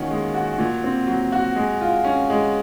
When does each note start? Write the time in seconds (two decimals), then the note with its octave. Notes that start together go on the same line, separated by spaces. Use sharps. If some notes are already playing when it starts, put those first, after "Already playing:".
Already playing: D#3 A#3 C#4 F#4
0.11 G#3
0.34 F#4
0.59 A#2
0.84 C4
1.07 F#3
1.32 F#4
1.56 G#3
1.81 F4
2.04 C#4
2.30 G#3